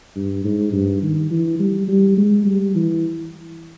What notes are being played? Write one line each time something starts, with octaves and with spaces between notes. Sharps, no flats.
G2
G#2
G2
D#3
E3
G3
G3
G#3
G3
E3